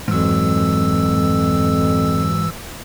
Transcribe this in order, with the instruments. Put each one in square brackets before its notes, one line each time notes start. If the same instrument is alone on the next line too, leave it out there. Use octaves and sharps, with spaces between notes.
[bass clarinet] F2 [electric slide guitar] G#2 F#3 [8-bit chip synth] E3 E6